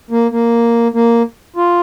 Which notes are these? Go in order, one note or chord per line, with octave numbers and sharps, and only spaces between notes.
A#3
A#3
A#3
F4